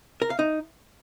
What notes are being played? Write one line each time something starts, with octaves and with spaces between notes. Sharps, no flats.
A#4
F5
D#4